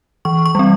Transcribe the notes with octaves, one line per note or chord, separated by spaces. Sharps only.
E3 C#6
C#6
G3 C4